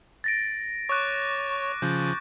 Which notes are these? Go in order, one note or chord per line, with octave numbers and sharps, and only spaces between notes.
A6 A#6 D7
C#5 C#6 D6 F#6
C#3 F3 G6